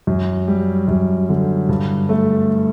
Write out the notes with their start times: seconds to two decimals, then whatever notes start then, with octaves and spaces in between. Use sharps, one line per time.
0.07 F#2
0.48 G3
0.88 F#2
1.29 D3
1.69 G2
2.09 A3